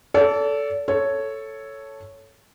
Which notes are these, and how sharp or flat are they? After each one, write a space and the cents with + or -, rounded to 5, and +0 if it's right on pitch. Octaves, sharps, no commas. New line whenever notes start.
A4 +0 D5 -40
A4 +0 C#5 +0